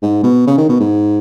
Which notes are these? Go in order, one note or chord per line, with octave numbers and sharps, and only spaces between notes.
G#2
B2
C#3
D#3
B2
G#2